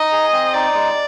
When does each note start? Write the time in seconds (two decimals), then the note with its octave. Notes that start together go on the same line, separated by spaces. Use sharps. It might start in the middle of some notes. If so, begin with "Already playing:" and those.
Already playing: D#4 D#5
0.12 G#4
0.32 C4
0.53 D#4 D5
0.74 G#3